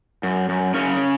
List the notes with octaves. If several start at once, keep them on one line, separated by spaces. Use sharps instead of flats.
F#2
F#2
F#2 C#3 C#4